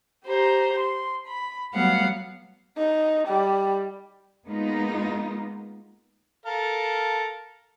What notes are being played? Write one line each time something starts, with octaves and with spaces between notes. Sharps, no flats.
G4 C5 A#5
C6
B5
F#3 G3 A3 B3 F5 F#5
D#4
G3
G#3 A#3 B3 D#4 F4
A4 A#4 F5